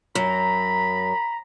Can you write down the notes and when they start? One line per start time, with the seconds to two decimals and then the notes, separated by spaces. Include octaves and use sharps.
0.15 F#2 A#5 B5